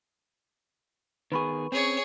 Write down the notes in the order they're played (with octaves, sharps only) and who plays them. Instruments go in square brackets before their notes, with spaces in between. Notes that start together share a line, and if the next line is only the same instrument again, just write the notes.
[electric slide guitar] D#3 B3 G#4 [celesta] B4 B5 C#6
[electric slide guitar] C4 C#4 [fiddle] G#4 C#5